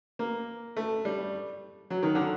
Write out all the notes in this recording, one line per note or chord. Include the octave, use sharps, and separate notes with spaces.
A#3
A3
G3
F#3
D#3
D3